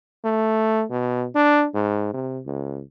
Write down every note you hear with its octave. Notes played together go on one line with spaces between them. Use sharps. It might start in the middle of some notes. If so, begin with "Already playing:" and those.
A3
B2
D4
G#2
C3
C#2